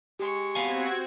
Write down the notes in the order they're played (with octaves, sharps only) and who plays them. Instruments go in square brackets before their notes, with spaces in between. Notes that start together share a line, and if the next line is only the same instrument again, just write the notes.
[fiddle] G#3 C#6 [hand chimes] G4
[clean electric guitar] B3 F5 G#5 [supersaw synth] C4 F#4 G#6